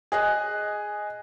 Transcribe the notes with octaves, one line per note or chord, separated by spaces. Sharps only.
G#4 D#5 F#6